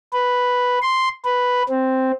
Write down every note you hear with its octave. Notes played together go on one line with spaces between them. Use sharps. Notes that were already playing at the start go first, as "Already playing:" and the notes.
B4
C6
B4
C4